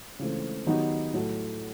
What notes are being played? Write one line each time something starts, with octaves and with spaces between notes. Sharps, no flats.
C#2 C#3 E3 A3 C4
D#3 F#3 B3 D#4 G4
A2 F#3 A3